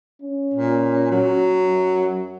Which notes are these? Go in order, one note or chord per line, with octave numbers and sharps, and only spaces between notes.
C#4
A#2
F#3
F#2